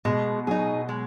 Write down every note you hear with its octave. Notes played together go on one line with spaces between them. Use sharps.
B2 G#3
F#3 D#4 G#4
G#3